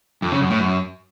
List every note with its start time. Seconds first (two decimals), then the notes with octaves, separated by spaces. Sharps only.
0.22 F2
0.32 C#3
0.41 F#2
0.50 A2
0.59 F#2